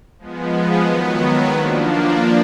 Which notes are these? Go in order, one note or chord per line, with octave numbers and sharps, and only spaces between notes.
F3 G#3 B3
D#3 F#3 B3
F3 A#3 D4